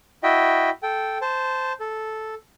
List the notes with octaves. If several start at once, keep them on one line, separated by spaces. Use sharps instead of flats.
E4 F#4 D#5 E5 G5
A4 G5
C5 A5
A4